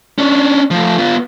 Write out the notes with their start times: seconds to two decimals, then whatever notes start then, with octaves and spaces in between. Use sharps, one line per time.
0.18 C#4 D4
0.71 F3 A3
0.98 B3 F4